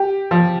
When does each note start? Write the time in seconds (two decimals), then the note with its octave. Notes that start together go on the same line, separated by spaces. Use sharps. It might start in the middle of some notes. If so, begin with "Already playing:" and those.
Already playing: G4
0.31 F3